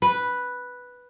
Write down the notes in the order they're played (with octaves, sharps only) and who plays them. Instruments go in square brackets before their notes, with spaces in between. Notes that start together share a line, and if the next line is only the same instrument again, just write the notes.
[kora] B4